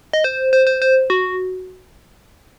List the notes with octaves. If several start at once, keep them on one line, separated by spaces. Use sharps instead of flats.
D#5
C5
C5
C5
C5
F#4